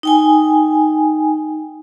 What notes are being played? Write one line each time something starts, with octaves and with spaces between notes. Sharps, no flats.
D#4 G5 G#5